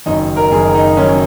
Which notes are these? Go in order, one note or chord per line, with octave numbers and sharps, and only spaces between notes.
F#1 F#2 D#3 D#4
A#4
F#1 F#2 D#3 G#4
D#4
F#1 F#2 D#3 C#4